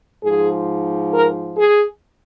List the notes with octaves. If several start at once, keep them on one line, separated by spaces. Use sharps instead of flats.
G#2 F3 G#4
A#4
G#4